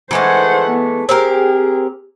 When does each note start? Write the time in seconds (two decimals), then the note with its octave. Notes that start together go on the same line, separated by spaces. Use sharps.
0.11 E3 G#3 A3 C5 F#5
0.69 B3
1.09 C4 G4 G#4 A#4